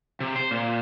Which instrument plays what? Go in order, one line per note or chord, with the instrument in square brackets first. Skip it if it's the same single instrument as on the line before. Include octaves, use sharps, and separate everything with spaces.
[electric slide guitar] C3
C5
A#2